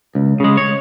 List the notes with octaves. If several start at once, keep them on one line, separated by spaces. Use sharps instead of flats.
C#2
C#3 G#3
C#5